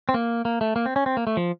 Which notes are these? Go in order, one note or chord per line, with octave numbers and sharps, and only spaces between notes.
C4
A#3
A#3
A3
A#3
C4
C#4
C4
A#3
A3
F3